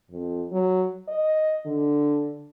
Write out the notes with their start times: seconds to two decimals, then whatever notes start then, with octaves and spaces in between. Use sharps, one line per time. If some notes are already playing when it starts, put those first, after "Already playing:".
0.11 F2
0.52 F#3
1.08 D#5
1.66 D3